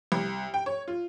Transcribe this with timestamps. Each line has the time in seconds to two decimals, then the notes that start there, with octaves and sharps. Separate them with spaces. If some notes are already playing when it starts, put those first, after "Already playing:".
0.12 C2
0.54 G5
0.66 C#5
0.88 F4